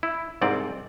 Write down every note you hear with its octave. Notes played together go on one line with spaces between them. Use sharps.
E4
C2 G#2 C4 D5